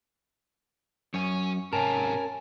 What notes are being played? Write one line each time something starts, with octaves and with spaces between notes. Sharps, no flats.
F#2 C#5 G#5
G#2 C3 C#4 A#4 G#5 A5